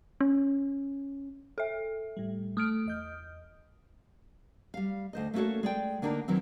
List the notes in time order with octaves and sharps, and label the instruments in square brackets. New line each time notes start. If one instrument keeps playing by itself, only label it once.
[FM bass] C#4
[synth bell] A4 E5
[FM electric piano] A2 G3
[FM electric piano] A3 [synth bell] D#6 F6 D7
[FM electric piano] E2 D#5 G6
[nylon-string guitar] G3 F5
D2 C5 D#5
A3 A#3 C#4 F#4 A4 C#5
G#3 D5 G5
D3 A#3 D4 D#4 A#4
D#3 E3 F#3 C4